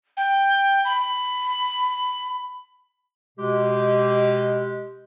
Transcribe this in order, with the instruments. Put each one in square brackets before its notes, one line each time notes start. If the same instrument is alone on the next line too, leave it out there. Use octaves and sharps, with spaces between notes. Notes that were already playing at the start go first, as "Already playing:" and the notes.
[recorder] G5
B5
[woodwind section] B2 G#3 G4